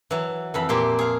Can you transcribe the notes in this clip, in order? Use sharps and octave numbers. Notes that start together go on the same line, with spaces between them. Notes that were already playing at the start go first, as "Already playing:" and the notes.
E3 F#3
F2 E3 B5
A#2 G4 C5 G5
G#4 F5